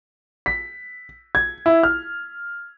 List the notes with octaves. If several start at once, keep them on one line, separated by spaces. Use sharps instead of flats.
B6
G#6
E4
F6